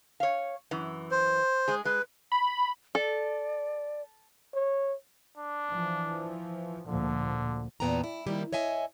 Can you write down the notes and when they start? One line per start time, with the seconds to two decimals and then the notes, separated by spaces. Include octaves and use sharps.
0.20 C#5 F5
0.71 F#2 E3
1.11 C5
1.68 G#3 G#4
1.85 G#3 B4
2.32 B5
2.95 A4 D5
4.54 C#5
5.37 D4
5.71 E3 F3
6.87 D2 A#2 D3 F3
7.80 E2 A#2 B3 G5 A5 A#5
8.04 E4
8.26 D#3 F3 G3 A#3 E4 G4
8.53 C#5 D#5 E5 G#5